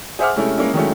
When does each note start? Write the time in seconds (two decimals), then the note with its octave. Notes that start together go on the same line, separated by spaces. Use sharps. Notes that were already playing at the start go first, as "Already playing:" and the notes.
0.19 G#4 C5 E5 F#5 D6 F6
0.36 C3 G#3 A3 C#4 E4
0.58 G#3 A#3 C#4 E4
0.74 D#3 F#3 G#3 A3 C#4 E4